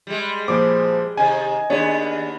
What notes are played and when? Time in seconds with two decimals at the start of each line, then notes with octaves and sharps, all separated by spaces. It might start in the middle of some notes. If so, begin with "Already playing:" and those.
0.07 G3 G#3
0.48 A#2 F3 C5 D6
1.17 C3 D#3 D#5 G#5
1.70 D#2 B3 D4 G#4 C#5